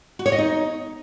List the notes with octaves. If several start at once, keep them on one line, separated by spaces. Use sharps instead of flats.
F#4
C#5
D#5
D#4